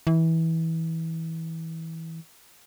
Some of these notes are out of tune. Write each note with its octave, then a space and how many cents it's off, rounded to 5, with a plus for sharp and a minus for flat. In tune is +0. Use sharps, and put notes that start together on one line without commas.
E3 -20